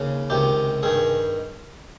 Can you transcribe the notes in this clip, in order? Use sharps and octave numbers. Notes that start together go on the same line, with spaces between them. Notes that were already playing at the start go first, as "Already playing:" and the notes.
Already playing: D#2 C#3
C#2 C3 D#3 G4
G2 D#3 G#4